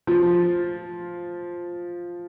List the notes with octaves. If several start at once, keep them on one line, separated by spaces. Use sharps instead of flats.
F3 F4